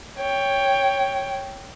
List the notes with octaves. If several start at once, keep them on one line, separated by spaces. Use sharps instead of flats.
C#5 G5